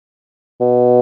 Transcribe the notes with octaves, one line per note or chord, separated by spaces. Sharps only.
B2